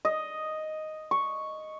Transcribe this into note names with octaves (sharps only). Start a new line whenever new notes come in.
D#5
C#6